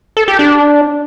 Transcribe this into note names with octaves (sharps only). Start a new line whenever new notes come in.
A4
G4
D4